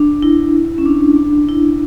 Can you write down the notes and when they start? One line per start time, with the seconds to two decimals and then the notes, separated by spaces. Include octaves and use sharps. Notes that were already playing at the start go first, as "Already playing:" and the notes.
Already playing: D4
0.22 E4
0.78 C#4
0.86 D4
1.16 D4
1.49 E4